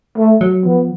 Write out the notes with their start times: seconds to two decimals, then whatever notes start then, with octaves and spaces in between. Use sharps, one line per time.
0.18 A3
0.41 F#3
0.65 F3 B3